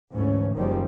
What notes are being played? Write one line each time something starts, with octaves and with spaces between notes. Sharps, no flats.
D2 G#2 E3 A3 C#4
F#1 D#3 F3 G3 G#3 C#4